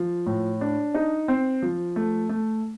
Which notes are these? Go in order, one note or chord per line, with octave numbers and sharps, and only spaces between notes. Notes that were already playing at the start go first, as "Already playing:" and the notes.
Already playing: F3
A2
D4
D#4
C4
F3
A3
A3